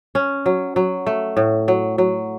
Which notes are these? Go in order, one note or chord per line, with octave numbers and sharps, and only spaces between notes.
C#4
F#3
F#3
A3
A2
F#3
F#3